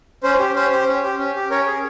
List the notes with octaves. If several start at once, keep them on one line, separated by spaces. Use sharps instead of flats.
C#4 C5
G4
C#4 C5
G4
C#4
G4
C#4
G4
C#4 A#4 C#5
G#4